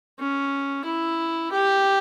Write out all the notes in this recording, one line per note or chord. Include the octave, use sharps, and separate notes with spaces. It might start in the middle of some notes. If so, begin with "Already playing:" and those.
C#4
E4
G4